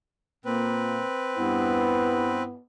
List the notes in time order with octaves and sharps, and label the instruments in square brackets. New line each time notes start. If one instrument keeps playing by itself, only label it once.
[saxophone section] A#2 A#3 [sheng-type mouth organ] C4 B4
[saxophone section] G2 E4 [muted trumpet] B3